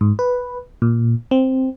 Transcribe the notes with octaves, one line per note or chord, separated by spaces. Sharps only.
G#2
B4
A#2
C4